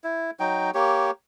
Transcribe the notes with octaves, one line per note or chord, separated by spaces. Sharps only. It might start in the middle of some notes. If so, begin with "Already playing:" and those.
E4
F#3 D#4 G5
A#3 G4 C#5